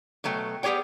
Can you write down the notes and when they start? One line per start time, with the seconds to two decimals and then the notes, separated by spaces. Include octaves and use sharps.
0.24 B2 F#3 A3 G5
0.63 G3 B3 G4 G#4 C#5 G5